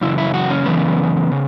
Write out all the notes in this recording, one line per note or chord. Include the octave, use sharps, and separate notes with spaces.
F#2 C#3 E3 E4
E4
F#4
C#4
F#2 C#3 E3 B3
C#3